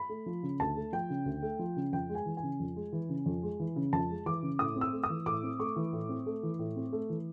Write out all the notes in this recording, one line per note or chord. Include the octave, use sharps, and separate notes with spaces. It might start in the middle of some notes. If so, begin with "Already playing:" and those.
Already playing: B5
A3
F3
C#3
D2 A5
A3
F3 G5
C#3
D2
A3
F3
C#3
F2 G5
G#3
G#5
E3
G#5
C#3
F2
G#3
E3
C#3
F2
G#3
E3
C#3
F2 A5
G#3
E3 D6
C#3
A2 D#6
C4
E6
A3
D#6
E3
A2 D6
C4
A3 C#6
E3
A2
C4
A3
E3
A2
C4
A3
E3